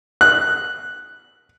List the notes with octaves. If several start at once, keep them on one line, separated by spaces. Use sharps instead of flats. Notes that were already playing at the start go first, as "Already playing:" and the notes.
F#6